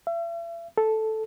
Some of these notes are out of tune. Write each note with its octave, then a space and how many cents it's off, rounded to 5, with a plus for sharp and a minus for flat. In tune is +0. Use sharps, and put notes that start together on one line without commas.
E5 +40
A4 -5